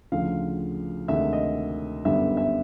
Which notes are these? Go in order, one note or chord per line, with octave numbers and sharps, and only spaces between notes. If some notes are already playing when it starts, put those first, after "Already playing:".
D2 C#3 F3 F5
D2 C3 D#3 G#3 E5
D#5
G1 F#2 D3 G3 B3 E5
E5